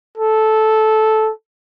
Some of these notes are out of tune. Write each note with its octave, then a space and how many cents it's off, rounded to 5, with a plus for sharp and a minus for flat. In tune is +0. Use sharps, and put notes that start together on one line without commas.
A4 -10